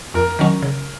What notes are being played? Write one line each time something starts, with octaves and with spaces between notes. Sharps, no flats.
F2 A#4
D#3 F#3 C#4
C#3